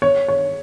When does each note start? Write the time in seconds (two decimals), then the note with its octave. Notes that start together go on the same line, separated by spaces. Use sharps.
0.02 C#5
0.28 C#5